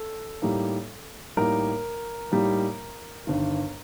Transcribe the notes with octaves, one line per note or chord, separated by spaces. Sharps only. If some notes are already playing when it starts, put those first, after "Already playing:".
Already playing: A4
A2 G3 A#3 D#4
A2 G3 A#3 D#4 A#4
A2 G3 A#3 D#4
G1 G2 D#3